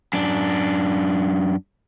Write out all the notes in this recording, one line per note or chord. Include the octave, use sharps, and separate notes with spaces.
F#2 D4